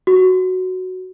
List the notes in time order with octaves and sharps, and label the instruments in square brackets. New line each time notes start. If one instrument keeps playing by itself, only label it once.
[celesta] F#4